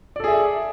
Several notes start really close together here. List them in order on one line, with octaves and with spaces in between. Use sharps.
D5 A4 G#4 E5